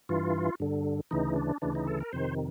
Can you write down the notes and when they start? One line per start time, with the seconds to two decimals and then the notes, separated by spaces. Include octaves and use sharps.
0.09 G2 E3 F4
0.60 G2 D3
1.11 D2 C#3 E3 D#4
1.36 D4
1.62 D2 C#3 E3 D4
1.75 D#4
1.87 A4
2.01 A#4
2.13 F2 C3 D#3 C5